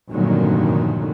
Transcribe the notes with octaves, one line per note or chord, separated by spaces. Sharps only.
F1 G2 A#2 D3 D#3 F#3